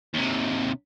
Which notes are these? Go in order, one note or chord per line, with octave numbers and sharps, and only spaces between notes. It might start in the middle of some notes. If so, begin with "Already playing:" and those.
D#2 C3